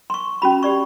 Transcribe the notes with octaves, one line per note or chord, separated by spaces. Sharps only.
C6 C#6
C#4 F#4 B5
G4 D5 C#6